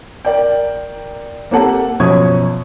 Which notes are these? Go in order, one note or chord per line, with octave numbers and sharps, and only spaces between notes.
A#4 D5 G5
A#3 C4 G4 A4 F#5 A5
F#2 B2 F3 C#6 D#6 G#6